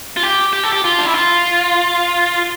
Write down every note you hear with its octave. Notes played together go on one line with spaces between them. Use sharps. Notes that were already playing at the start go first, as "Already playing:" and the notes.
F4
G4
G4
A4
G4
F4
D4
E4
F4